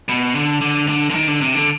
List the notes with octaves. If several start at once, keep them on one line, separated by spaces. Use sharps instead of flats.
B2
D3
D3
D3
D3
D#3
D3
C3
D3